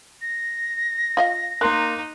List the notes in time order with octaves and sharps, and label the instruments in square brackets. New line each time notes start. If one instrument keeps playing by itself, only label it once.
[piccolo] A#6
[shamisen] F4 D#5 F5
[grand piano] A#3 C6 F#6 [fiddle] D#4 [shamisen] A#4